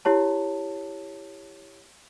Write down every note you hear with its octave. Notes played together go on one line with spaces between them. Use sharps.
E4 G4 C#5 A5